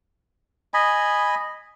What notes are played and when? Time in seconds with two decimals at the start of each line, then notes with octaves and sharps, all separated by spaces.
0.74 D#5 G#5 B5